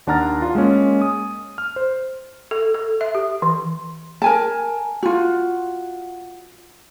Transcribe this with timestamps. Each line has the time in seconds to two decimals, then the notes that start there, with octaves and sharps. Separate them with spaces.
0.07 D#2 D4 F#5 A#5 F6 A6
0.42 F4
0.55 G#3 A#3 C#4
1.02 D#6
1.58 F6
1.76 C5
2.51 A4
2.74 A4
3.01 E5
3.15 G4
3.42 E3
4.22 A#4 G#5 A5
5.03 F4 F#4